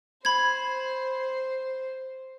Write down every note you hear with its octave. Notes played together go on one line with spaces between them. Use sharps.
C5 B5 G#6